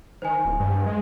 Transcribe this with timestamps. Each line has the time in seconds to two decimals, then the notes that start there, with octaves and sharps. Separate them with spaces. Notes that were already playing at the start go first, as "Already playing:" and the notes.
0.22 D#3 C5 G#5
0.45 D1
0.59 G2
0.86 G#3